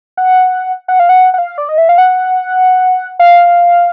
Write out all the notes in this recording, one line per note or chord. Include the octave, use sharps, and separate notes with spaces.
F#5
F#5
F5
F#5
F#5
F5
D5
D#5
E5
F5
F#5
F5